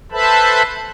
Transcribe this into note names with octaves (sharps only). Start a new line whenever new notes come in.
A4 B4 C5 E5 A5 B5